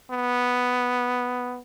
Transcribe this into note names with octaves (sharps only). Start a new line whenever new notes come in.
B3